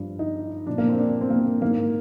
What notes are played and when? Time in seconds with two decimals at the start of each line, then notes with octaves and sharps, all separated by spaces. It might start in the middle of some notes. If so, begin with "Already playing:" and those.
Already playing: G2 F3
0.19 D#4
0.67 A#2 F3 D4
0.78 A#3
0.89 C4
0.98 D4
1.21 C4
1.30 A#3
1.62 G#2 D#3 A#3